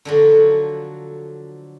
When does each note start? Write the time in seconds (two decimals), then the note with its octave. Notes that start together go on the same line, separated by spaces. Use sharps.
0.05 D3 F3 F#3